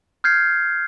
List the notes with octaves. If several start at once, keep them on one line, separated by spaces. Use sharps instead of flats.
F6 G6 G#6 C7